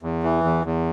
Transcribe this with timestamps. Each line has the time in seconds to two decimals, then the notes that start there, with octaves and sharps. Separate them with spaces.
0.03 E2
0.23 E3
0.44 E2
0.65 E2